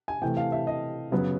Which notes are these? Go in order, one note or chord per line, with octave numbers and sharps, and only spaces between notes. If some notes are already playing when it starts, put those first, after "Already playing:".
G#5
C3 E3 A3 G5
F5
E5
D#5
F#2 C#3 F#3 B3